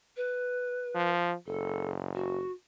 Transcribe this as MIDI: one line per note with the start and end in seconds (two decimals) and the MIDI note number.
0.17 1.12 71
0.95 1.34 53
1.47 2.43 30
1.47 1.90 69
2.15 2.52 66